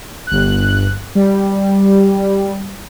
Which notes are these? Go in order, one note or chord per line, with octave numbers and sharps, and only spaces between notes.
G1 F#6
G3